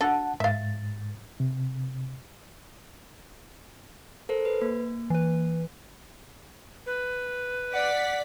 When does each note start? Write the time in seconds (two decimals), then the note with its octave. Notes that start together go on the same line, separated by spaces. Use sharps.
0.01 D4 F#4 A4 F#5 A5
0.40 G#2 E5 F5 A6
1.40 C3
4.29 A4 A#4 C5
4.45 B4
4.62 A#3
5.10 E3 B4
6.86 B4
7.74 D5 F#5 B6